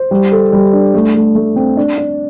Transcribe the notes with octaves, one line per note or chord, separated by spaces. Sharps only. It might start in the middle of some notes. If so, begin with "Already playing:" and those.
Already playing: C5
G3
A4
G3
D4
A3
A3
A3
C4
D4
D4